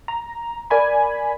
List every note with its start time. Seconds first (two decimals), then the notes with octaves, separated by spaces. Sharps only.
0.08 A#5
0.70 A#4 D5 G#5 B5